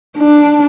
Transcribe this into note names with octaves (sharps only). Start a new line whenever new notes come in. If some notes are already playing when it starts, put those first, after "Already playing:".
D4